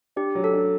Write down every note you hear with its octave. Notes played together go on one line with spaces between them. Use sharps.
D4 G4
F#3
A4
D4